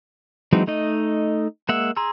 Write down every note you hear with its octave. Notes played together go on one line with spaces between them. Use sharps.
E3 F#3 G#3 C4 D#4
A3 D#4 D#5
G#3 A#3 E5 F#5 E6
G#4 A#5 C6 E6